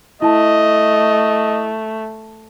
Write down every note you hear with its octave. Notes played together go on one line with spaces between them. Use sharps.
A3 E4 D#5 A5